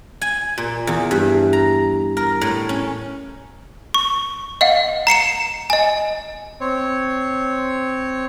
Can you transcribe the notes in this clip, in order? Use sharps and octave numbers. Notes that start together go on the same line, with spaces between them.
G#5
A#2
E2
G2
A#5
A#4
A2
C#4
C#6
D#5 F5 F#5
A#5 C7 C#7 E7
D#5 G#5
C4 C#5